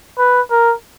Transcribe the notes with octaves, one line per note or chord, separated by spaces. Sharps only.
B4
A#4